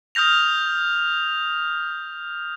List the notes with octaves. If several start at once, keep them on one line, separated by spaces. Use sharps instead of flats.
D#6 F6 G6 A#6 F7